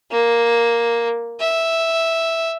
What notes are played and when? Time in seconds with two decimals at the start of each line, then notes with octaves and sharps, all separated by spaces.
0.11 A#3
1.40 E5